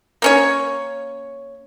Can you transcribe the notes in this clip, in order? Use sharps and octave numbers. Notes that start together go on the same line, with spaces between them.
A#3 C#4 C#5